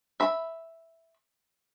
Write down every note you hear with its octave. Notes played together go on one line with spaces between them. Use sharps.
E5 B5